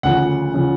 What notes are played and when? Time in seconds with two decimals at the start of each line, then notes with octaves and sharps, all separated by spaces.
0.03 D2 C#3 F3 F#5
0.54 C#3 F3